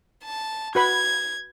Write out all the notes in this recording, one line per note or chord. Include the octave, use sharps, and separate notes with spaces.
A5
F#4 B4 B5 G#6